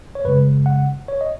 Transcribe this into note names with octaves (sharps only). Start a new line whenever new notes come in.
C#5
F#2 C#3 G#3 B4
F#5
C#5
D#5